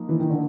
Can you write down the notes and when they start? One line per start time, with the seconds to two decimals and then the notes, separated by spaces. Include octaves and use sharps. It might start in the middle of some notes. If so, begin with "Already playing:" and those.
Already playing: F3 A#3 D#4
0.09 E3
0.20 D#3
0.30 D3